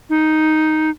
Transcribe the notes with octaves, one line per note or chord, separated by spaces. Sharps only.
D#4